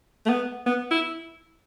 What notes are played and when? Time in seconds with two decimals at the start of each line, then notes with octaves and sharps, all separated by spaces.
0.26 A3
0.29 B3
0.66 B3
0.91 E4